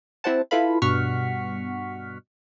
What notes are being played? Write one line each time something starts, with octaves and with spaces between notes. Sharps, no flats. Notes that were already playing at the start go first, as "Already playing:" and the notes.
C4 E4 G4 C5 F#5 A5
E4 F4 A4 B4 F5 B5
G2 B2 F#5 C#6 F6 B6